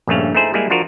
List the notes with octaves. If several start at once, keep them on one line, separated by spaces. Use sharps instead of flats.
A#1 G2 C#3 A3 C#4 F5
A3 D#4 E4 G#4 C5
G3 G#3 A#3 E4 G#4
F3 D4 F4 F#4 A#4